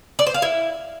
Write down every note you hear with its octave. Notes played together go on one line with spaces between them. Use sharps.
D5
C5
F5
E4